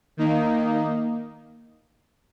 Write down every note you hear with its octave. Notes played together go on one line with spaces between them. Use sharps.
D#3 A#3 D#4